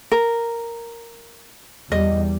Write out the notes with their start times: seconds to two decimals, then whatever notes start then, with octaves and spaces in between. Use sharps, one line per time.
0.11 A#4
1.92 E2 G3 D#5